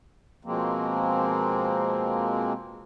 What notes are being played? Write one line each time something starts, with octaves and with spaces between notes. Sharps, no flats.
B2 F3 G#3 A#3 C4